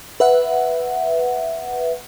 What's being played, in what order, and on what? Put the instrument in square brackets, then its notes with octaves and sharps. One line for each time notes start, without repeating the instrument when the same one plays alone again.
[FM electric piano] B4 E5 F#5